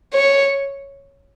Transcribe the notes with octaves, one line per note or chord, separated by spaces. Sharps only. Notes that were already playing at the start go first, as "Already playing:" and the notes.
C#5